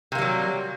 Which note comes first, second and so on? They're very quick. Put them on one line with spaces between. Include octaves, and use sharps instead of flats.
C3 A#3 G3 F#3